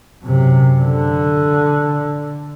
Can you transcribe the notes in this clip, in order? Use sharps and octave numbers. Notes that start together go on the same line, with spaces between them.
F#2 C3
D3